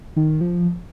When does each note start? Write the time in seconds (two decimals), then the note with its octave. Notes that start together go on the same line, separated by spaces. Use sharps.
0.16 D#3
0.41 F3